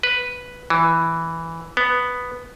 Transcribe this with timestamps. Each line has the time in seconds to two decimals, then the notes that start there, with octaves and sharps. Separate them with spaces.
0.03 B4
0.70 E3
1.77 B3